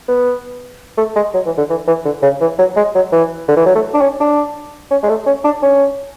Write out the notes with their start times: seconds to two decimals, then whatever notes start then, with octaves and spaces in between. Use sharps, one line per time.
0.09 B3
0.98 A3
1.16 G#3
1.34 F#3
1.46 E3
1.58 D3
1.70 E3
1.88 E3
2.05 D3
2.23 C#3
2.41 E3
2.59 F#3
2.77 G#3
2.95 F#3
3.12 E3
3.49 D3
3.57 E3
3.66 F#3
3.75 A3
3.94 D4
4.02 C#4
4.20 D4
4.91 C#4
5.04 G#3
5.09 A3
5.27 C#4
5.45 D4
5.63 C#4